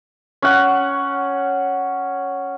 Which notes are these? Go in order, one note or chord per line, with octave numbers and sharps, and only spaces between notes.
C#4 F#5